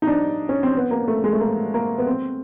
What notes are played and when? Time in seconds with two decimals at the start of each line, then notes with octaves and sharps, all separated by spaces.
0.02 D#4
0.07 D4
0.49 C#4
0.63 C4
0.77 B3
0.91 A#3
1.08 A3
1.24 G#3
1.33 A3
1.40 A#3
1.74 A#3
1.98 B3
2.07 C4